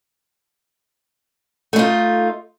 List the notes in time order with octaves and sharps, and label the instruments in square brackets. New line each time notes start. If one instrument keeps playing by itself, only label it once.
[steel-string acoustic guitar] A3
D#4
F4